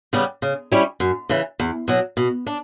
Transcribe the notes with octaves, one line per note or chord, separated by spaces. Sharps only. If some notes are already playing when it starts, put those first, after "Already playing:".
C#3 G3 B3
C#3
G3 C#4 E4
F#2
C#3 E3
E2
B2 F#3
B2
D4